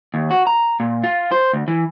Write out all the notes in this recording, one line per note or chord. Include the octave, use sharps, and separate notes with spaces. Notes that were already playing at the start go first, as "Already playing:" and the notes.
D#2
F#4
A#5
A#2
F4
C5
D2
E3